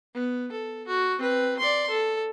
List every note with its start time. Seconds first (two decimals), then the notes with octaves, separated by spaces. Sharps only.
0.14 B3
0.52 A4
0.87 F#4
1.19 C4 B4
1.60 D5 C6
1.90 A4